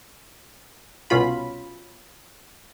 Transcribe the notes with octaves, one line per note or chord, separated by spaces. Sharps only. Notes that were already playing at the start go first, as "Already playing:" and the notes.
C2 B2 C#4 F4 B5